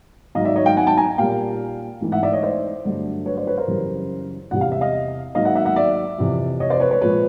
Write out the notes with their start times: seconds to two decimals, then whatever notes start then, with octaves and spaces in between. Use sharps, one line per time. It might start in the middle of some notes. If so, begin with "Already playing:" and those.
0.35 G#2 D#3 F#3 D#5 F5
0.45 D5 E5
0.56 C#5 D#5
0.66 F5 G5
0.77 F#5 G#5
0.87 G5 A5
0.97 G#5 A#5
1.18 A#2 G3 A#3 F5 G5
2.01 G#2 E3 A3
2.12 E5 F#5
2.23 D5 E5
2.33 C#5 D#5
2.43 C5 D5
2.85 G2 D3 F#3 A3
3.26 B4 C#5
3.37 C5 D5
3.47 B4 C#5
3.57 A#4 C5
3.68 F#2 C#3 E3 G3
4.51 E2 C3 E3 G3 F#5
4.61 F5
4.72 E5
4.81 D#5 F5
5.35 G#2 D#3 F#3 A#3 D#5 F5
5.45 E5 F#5
5.55 E5 F#5
5.65 E5 F#5
5.76 D5 E5
6.18 F2 C3 E3
6.60 C#5 D#5
6.70 C5 D5
6.80 B4 C#5
6.91 B4 C#5
7.01 A#2 F3 G#3 B4 C#5